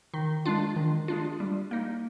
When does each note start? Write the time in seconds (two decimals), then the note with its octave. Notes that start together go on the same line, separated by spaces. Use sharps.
0.14 D#3
0.46 G#3 D4 F4
0.76 D#3
1.08 G#3 D4 F4
1.40 G3
1.71 A#3 D#4